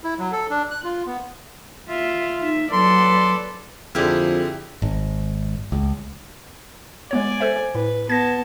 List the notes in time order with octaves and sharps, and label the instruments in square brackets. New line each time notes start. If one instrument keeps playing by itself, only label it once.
[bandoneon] E4
F#3
A4
D4
F#6
F4
B3
[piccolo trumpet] F4 [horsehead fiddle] E5
[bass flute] D#4 [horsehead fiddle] E5
[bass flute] F#3 [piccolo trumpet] A4 [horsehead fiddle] B4 D5 [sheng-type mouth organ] C6
[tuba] F2 [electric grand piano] D3 G#4 F6 [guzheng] E4 G4
[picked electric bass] G#1
C#2
[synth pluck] G#3 B3 C#5 [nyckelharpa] D5 G#5
[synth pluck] A4 C5 E5
[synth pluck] A2 [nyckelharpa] B4
[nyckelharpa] B3 A5 [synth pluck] G#6 A#6